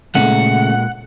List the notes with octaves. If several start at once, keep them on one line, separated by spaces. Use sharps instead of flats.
A#2 C#3 G#3 A3 F#5